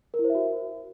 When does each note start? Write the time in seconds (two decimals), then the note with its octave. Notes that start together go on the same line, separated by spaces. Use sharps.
0.14 A#4
0.19 E4
0.24 C5
0.30 E5
0.35 F#4